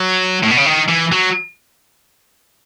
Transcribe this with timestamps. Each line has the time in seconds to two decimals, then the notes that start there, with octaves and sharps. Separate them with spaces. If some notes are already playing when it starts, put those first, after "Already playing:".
Already playing: F#3
0.43 A2
0.51 B2
0.57 C#3
0.66 D#3
0.89 E3
1.12 F#3